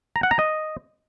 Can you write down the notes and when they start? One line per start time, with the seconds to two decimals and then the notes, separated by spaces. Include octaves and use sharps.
0.16 A#5
0.23 F#5
0.31 A#5
0.39 D#5